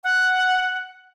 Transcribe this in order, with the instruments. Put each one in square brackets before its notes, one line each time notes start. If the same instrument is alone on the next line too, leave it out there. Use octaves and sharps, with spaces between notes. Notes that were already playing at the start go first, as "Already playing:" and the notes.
[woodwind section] F#5